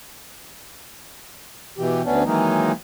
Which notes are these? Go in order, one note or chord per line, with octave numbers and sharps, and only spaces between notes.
B2 E3 G4
D2 B3 C#4 D4
D#3 E3 F#3 G#3 A#3 D#4